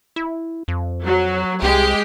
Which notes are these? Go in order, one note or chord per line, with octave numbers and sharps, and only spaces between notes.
E4
F2
F#3
C2 G#3 G4